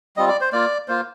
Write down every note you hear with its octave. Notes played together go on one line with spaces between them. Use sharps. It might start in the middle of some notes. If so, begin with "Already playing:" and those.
G3 C4 F4 D#5
D5
C5
A#3 F4 D5
A#3 F4 C5